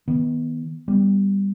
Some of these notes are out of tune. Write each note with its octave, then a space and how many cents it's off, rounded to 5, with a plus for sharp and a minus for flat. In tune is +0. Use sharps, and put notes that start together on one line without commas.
D#3 +20 B3 -15
G3 +10 B3 +0